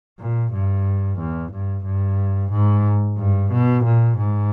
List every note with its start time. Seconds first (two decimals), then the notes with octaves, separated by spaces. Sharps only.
0.20 A#2
0.53 G2
1.19 E2
1.53 G2
1.85 G2
2.52 G#2
3.18 G2
3.52 B2
3.84 A#2
4.18 G#2